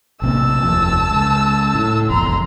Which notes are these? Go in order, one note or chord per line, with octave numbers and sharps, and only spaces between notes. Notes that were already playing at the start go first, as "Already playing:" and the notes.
A#1 C3 A#3 A5 E6
F1 D#2 F3
C#2
A2
F1 A#1 E2 A#5 C6